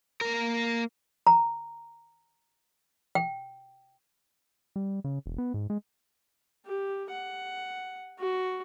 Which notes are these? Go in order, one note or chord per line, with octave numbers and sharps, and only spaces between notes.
A#3 A#4
A#5
G5
G3
C#3
E1
B3
G#2
G#3
G4
F#5
F#4